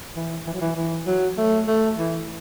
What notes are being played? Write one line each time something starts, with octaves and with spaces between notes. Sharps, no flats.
E3
E3
F#3
E3
E3
F#3
A3
A3
E3